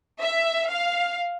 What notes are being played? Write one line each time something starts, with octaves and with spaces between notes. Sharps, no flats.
E5
F5